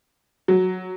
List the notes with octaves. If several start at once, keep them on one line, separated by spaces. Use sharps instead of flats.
F#3